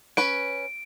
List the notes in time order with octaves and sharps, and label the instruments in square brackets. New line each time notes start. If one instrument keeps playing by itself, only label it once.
[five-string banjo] C#4 B4 [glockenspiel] D7